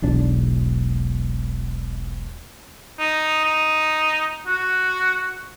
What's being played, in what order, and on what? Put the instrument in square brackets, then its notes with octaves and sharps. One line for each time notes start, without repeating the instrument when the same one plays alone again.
[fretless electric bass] E1 B1 D4
[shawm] D#4
D#4
F#4